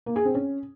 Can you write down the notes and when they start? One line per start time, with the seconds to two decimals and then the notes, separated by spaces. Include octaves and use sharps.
0.06 A#3
0.16 G#4
0.25 C4
0.35 C#4